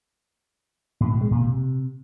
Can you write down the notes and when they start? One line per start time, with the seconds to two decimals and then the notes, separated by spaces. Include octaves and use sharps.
1.01 A2
1.11 B2
1.21 G#3
1.31 A#2
1.41 C3